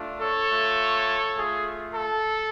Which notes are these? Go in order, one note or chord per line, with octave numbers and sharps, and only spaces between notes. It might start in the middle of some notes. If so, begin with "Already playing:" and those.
Already playing: A3 D4 F4
A4 C#5
A3 F4
A3 F4 G#4
A4